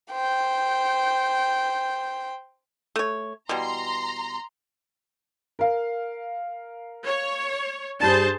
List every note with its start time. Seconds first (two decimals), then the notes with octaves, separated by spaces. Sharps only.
0.12 C5 G5
2.96 A3 C#5
3.49 B2 E3 G3 A#5 C6
5.59 A#4 F5
7.05 C#5
8.00 G2 D4 G#4 C5 A5